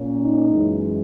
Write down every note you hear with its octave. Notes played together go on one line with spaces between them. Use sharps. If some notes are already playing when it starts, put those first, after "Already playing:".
Already playing: A#2 A#3 C#4
D#4
F#2 E3 G#3